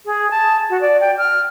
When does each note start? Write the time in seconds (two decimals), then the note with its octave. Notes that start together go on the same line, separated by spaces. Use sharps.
0.06 G#4
0.31 A5
0.70 F#4
0.81 D5
1.00 G5
1.18 F6